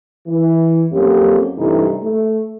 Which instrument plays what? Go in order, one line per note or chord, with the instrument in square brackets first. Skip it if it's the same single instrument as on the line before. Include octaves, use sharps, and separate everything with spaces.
[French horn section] E3
F2 F#3 A#3 C#4 G4
G2 C3 E3 A3 D#4
A3